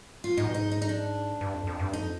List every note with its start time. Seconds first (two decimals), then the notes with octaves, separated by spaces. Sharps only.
0.24 F4
0.37 G#2 D#4
0.46 B2
0.54 G#2 D#4
0.71 D#4
0.82 D#4
0.89 D4
1.41 G2
1.54 F2
1.67 F2
1.79 G2
1.93 F2 D#4